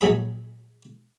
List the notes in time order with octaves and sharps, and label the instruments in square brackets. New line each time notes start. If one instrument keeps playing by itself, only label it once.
[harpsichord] A#1 F#3 G#4 B5